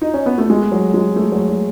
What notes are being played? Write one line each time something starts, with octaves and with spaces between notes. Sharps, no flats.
D#4
C#4
B3
A3
G#3
F#3
G#3
A3
F#3
F#3